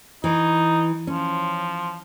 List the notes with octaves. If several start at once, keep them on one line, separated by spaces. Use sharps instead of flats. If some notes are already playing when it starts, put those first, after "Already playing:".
E3 D#4
F3 C#4